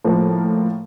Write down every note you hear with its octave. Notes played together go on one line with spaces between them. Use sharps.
A2 F3 A#3